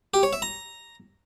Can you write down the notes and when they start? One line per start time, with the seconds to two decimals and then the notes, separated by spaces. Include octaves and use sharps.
0.14 G4
0.23 C#5
0.33 E5
0.42 A#5